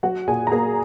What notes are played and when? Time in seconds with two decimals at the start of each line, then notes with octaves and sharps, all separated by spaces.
0.03 F#3 F#4 F#5
0.27 A#2 G#4 G#5
0.47 A#5
0.52 A#3 G#4 G#5